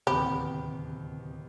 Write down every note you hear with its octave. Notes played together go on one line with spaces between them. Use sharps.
D1 D#2 C3 B3 G4 B5